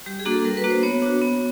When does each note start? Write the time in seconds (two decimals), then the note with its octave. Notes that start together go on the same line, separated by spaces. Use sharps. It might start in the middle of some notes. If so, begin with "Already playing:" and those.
0.06 G3 G4
0.20 G#4
0.25 A#3 D4 F#4
0.32 A4
0.45 G3 A#4
0.57 B4
0.64 A#3 D4 F#4
0.70 C5
0.83 B3 C#5
1.02 D4 F#4
1.21 B3